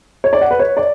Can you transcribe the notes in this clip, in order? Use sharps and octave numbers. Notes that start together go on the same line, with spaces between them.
C#5
D5
F#5
B4
C#5
D5